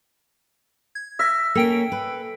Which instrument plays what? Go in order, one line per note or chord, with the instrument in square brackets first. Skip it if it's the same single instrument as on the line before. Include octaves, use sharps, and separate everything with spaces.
[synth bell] G#6
[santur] E5 [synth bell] F6 A#6 B6
[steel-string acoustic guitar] A#3 C#4 [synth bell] A4 G5 D7
[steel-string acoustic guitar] B4